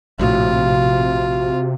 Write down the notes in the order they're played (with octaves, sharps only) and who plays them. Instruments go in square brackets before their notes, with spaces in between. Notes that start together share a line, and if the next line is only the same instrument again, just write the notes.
[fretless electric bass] A#1 A2 [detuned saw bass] C3 [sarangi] F4 [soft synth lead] F#4